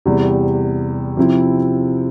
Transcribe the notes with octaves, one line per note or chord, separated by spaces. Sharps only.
E2 C3 G3
C3 F3 C4 E4